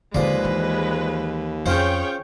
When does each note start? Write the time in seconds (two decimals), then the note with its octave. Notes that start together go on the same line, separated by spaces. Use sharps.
0.14 D#2 D3 F3 G#3 C4 B4 D5
0.45 E3
1.66 F2 C#4 F4 G#4 C5 C#5 G5